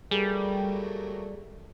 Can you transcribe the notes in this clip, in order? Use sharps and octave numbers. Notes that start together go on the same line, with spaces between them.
F#3 G3 A3 A#3 G#4